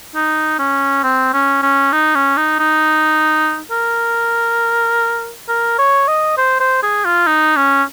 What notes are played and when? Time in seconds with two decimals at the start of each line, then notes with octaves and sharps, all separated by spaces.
0.15 D#4
0.59 C#4
1.03 C4
1.33 C#4
1.63 C#4
1.92 D#4
2.15 C#4
2.37 D#4
2.59 D#4
3.71 A#4
5.49 A#4
5.78 C#5
6.08 D#5
6.38 C5
6.60 C5
6.82 G#4
7.05 F4
7.27 D#4
7.56 C#4